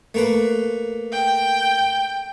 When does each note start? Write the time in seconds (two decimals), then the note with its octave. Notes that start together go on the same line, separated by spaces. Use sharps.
0.14 A3 A#3 B4
1.13 G5